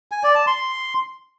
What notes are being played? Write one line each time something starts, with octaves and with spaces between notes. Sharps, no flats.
G#5
D5
A5
C6